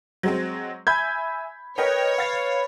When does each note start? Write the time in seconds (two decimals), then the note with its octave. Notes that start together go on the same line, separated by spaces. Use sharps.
0.23 F#3 G#3 C4
0.87 E5 G#5 B5 G6 G#6
1.78 A#4 B4 C#5 D#5 G5
2.18 F5 A6